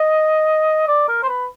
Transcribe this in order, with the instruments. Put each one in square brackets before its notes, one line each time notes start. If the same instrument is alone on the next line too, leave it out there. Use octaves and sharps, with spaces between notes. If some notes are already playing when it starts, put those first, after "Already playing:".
Already playing: [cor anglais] D#5
D5
A#4
C5
B4